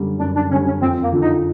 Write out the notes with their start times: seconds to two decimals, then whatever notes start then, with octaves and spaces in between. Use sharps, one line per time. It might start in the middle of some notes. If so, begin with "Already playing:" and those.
Already playing: F#2 D3 G3
0.19 F#2 D4
0.35 D4
0.51 D3 C#4
0.54 G3
0.66 C#4
0.81 F2 C4
1.02 A#3
1.12 D3 F3
1.22 D#4